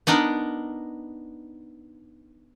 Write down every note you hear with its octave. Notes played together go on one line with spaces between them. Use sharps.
B3 D4 D#4 A#4